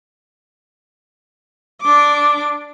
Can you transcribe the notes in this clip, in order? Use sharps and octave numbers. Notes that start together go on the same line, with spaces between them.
D4 D6